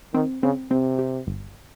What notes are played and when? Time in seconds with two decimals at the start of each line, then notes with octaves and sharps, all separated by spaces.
0.14 D#3 C4
0.43 C#3 C4
0.71 C3 C4
0.99 G4
1.27 G1